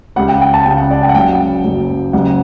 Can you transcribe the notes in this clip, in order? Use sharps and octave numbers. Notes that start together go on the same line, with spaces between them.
C#2 C#3 G3 F#5
G5
G5
A5
C#2 C#3 G3 G5
F#5
D5
G5
F#5
F#1 F#2 C#3 F#3 G5
F#1 F#2 C#3 F#3
F#1 F#2 C#3 G3 F#5